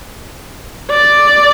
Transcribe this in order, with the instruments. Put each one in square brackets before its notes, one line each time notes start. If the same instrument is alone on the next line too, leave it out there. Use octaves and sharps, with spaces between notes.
[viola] D5